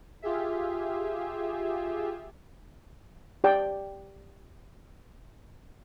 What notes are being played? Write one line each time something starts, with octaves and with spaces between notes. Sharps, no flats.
F4 G4 G#4 E5
G4 D5 G5